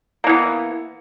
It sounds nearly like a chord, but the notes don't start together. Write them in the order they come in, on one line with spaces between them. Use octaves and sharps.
A#3 E3 B3